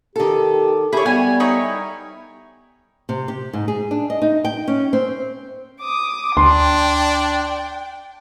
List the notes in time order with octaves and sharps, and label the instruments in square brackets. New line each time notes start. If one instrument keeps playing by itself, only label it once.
[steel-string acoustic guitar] D#3 A4 [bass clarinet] G4
[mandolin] E4 C#5 [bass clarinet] G4 [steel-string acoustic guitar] G#4
[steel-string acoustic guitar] G3 [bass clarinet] B3 [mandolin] G#5
[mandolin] D#4 E4 C#5
[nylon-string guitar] C3
G4
G#2
G#4
D4
D#5
D#4
G5
C#4
C4
[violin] D6 D#6
[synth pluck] D2 [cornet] D4 [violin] G5 [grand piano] C6